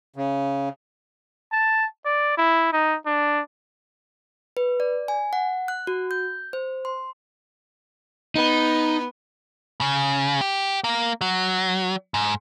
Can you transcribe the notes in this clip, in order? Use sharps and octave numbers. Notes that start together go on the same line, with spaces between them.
C#3
A5
D5
E4
D#4
D4
B4
D5
G#5
F#5
F#6
F#4
G6
C5
C6
B3 D#4
C#3
G4
A#3
F#3
G#2